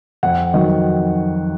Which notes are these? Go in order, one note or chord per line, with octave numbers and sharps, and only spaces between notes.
F2 F#5
D#3 F#3